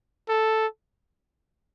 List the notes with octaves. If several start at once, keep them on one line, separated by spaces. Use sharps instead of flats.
A4